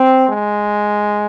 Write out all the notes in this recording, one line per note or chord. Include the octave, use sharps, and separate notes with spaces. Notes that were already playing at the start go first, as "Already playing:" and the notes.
Already playing: C4
G#3